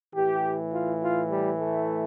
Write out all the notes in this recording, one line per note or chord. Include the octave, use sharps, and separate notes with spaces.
A2 E3 G4
F4
F4
G3
A3